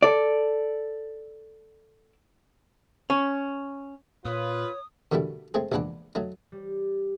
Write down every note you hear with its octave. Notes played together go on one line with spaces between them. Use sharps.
A4 D5
C#4
A#2 F4 B4 C#5 D#6
B2 D3 D#3 G3 A3 E4
G#3 A3 C4 G#4
A#1 E2 G#3 D4 B4 F#5
F#3 A3 D#4
G3